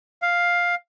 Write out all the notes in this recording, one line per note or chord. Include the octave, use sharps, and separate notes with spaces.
F5